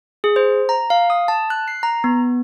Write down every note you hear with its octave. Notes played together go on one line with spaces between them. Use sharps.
G#4
C5
A#5
F5
D#6
A5
F#6
C7
A#5
B3